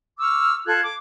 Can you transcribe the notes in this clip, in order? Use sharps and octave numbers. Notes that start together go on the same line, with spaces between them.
C#6 D6 E6 F6
F4 A4 F#6 G#6
D6